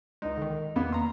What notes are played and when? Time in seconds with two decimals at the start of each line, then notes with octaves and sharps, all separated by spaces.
0.22 C#2 G#3 D#4
0.38 D3 D#3
0.76 E2 A#3 B3
0.92 A#5 C6